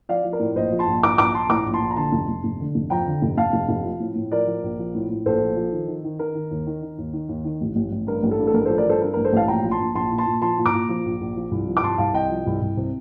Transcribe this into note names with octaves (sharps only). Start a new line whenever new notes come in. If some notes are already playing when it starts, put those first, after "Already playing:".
F3 D5 F5
F3
A#4 D5
A2
A#1 C5 D#5
F3
A5 C6
A#1
A#1 A#5 D6
A#1 A#5 D6
A#1 A5 C6
A2 A#5 D6
A#1
A5 C6
A#1
A#5
D3 A5 C6
F1
F1
F1
D3
F1
F2 G5 A#5
D3
F1
F1 F5 A5
F1
F1
F3
A2
A2
F3 A#4 D5
F3
A#1
F3
A2
A2
A#1 A4 C5
F3
F3
D#3
D#3
D#3
D#3 A#4
D#3
D#2
D#3
D#3
D#2
D#3
D#2
D#3
A1
A1
A1
G2 A#4
A1
A4
G2
A4
A1 A#4
A4 C5
F3
A#4 D5
G2 A4 C5
G2 A#4
A#4
A1
A4 C5
A1 F5 A5
A#1 G5 A#5
F3
A5 C6
A#1
A#1 A5 C6
A#2
A5 C6
A#2
F3 A5 C6
A#2
A#5 D6
A#2
F3
A#1
A#1
F3
C2
F3
D6
C2 A5 C6
C2 F5 A5
C2 D#5 G5
F3
C2
C2
C3